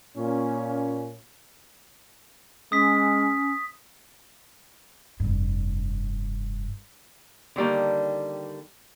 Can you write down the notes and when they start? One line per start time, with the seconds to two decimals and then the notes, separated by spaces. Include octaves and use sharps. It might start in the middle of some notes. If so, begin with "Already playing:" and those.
0.17 A#2 C#4
2.72 G#3 C#4 D#6 B6
5.20 F1 G2
7.56 D3 D#3 G3 A#3